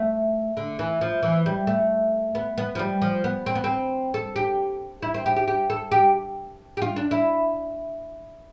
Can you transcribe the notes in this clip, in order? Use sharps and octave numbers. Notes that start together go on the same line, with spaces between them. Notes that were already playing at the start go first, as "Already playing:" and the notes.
Already playing: A3
D3
E3
F3
E3
G3
A3
B3
B3
F3
G3
F3
B3
C4
B3
C4
A4
G4
E4
C4
G4
G4
G4
A4
G4
G4
F4
D4
E4